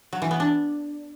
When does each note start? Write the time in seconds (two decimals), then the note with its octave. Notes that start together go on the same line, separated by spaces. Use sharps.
0.13 F#3
0.22 E3
0.31 B3
0.40 D4